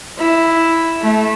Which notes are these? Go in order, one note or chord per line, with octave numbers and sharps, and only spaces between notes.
E4
A3